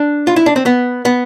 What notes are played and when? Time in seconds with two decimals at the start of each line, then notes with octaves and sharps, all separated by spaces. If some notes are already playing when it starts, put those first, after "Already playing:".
Already playing: D4
0.27 F4
0.36 E4
0.46 D4
0.56 C4
0.66 B3
1.05 B3